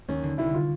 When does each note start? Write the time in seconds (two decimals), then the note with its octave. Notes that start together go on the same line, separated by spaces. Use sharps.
0.08 D#2 C#4
0.23 D3
0.38 C2 E4
0.54 F4